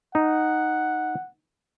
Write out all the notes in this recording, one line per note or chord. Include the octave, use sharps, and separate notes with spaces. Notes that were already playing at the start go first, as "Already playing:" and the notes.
D#4 F#5